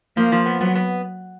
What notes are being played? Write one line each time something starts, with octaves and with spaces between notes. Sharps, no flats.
F3 A#3
F3
B3
F#3 B3
B3